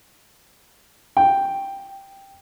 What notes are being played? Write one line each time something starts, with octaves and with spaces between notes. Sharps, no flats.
G5